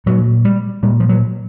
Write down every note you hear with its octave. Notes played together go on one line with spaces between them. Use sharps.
A#2 F#3
G3
A#2 G3
F3
F#3